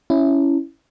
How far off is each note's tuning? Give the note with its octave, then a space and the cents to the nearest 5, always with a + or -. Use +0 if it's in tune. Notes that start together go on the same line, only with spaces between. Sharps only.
C#4 +0 E4 +0